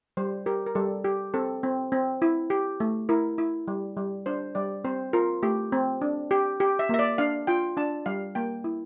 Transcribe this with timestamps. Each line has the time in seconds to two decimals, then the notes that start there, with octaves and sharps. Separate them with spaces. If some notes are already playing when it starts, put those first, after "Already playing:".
0.17 G3 C5
0.46 G4 A#4
0.66 A#4
0.75 G3 A4
1.04 G4
1.34 C4 A4
1.63 C4
1.92 C4
2.22 E4
2.50 G4
2.80 A3
3.09 E4 A#4
3.38 E4
3.68 G3
3.97 G3
4.26 D4 C5
4.55 G3 D5
4.85 C4 C5
5.13 F4 A#4
5.43 A3 G4
5.72 C4
6.02 D4
6.31 G4
6.60 G4
6.79 E5
6.89 A#3 E5
6.99 D5
7.18 D4 F5
7.47 F4 G5
7.77 D4 A5
8.06 G3 F5
8.35 A#3 G5
8.64 E4